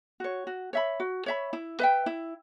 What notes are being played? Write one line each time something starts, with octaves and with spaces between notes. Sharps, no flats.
F#4 C#5
F#4
C#5 E5 B5
F#4
C#5 E5 B5
E4
B4 E5 G5
E4